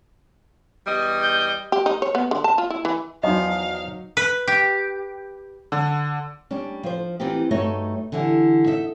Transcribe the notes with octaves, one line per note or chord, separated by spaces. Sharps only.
E2 G3 D#5
G6
G4
D#4
C#5
B3
D3
A5
F4
E4
E3
E2 F3 F#3 D#4 C5 D#5 F5
B4
G4
D3
G3 C#4 D4
F3 C5
E3 C4 D#4 F4 G4
G2 A3 D#4 F#4 C#5 D#5
D3 E3 G3
D#4 E5